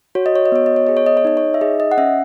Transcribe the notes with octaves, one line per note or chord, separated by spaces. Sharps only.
F#4 C#5
D#5
C#5
D#5
B3 C#5
D#5
C#5
G#4 D#5
C#5
D#5
C#5
D#4 D#5
C#5
E5
G#4 D#5
D#5
F#5
C#4 E5